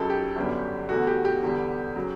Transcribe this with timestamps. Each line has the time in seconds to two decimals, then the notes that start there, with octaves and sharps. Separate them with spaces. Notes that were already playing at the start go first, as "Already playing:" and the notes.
Already playing: C#2 C#3 F#3 A4
0.10 G4
0.36 G1 F#2 D3 G3
0.89 E2 D3 A3 F#4
1.07 G4
1.25 G4
1.43 E2 D3 G3
1.96 C#3 F#3